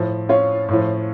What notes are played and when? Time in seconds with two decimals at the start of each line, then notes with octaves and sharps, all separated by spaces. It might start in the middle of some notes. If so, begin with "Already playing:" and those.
Already playing: A2 F3
0.29 C#4 F4
0.69 A2 F3